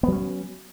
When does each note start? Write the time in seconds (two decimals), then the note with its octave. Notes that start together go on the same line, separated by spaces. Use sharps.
0.03 B3
0.08 F#3
0.12 C#4